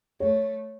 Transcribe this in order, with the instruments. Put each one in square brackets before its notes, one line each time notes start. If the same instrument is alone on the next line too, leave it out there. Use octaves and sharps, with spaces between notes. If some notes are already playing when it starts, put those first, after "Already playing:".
[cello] A3 [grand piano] C#5